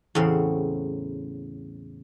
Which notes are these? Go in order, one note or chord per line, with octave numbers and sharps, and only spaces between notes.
E2 A2 C#3 C4